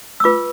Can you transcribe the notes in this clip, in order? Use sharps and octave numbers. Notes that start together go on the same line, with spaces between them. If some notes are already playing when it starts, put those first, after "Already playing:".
E6
F4 B4 D6